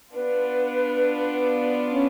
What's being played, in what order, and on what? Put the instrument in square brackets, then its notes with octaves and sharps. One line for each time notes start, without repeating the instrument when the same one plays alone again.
[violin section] B3 D4 F4 [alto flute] B4
[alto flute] C#4